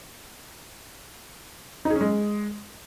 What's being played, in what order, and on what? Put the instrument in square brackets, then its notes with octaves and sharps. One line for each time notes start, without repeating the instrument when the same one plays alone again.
[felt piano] D#4
G#4
C#4
G#3